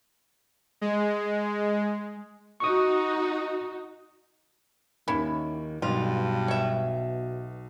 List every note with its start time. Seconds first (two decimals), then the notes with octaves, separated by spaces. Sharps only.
0.81 G#3
2.60 D#4 F#4 C#6 D#6
5.08 D#2 D#3 A#3 C#4 E4
5.82 B1 G2 B2 F4
6.48 C#5 E5